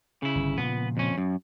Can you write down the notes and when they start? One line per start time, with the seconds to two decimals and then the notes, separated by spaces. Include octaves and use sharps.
0.22 C#3 E4
0.36 G1
0.58 A#2 C#3 F3 B3
0.97 F2 C#4
1.18 F#2